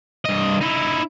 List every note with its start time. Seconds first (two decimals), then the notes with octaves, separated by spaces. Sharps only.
0.25 G2 D#5
0.61 D#4 E4